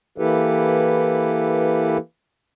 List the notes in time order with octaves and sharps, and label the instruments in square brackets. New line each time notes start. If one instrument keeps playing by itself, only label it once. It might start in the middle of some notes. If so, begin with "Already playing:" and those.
[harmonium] E3 A#3 E4 G4 A4 B4